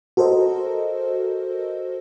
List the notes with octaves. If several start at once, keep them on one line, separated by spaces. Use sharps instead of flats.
F#4 A4 A#4 C5 D#5